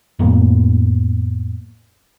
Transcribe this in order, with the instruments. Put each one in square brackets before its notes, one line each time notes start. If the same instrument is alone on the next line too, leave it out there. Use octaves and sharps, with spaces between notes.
[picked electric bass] F2 A2 A#3 B3